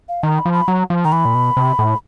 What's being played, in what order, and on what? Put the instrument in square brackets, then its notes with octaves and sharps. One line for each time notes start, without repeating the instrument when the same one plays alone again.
[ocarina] F5
[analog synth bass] D#3 [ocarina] A#5
[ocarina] B5
[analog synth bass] F3
[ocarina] B5
[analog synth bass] F#3 [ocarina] A#5
[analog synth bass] F3
[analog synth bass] D#3 [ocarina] A#5
[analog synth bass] E3 [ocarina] B5
[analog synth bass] A#2
B2
C3
A2